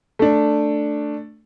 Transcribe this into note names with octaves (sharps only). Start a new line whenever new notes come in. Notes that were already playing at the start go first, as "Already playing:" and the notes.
A3 D4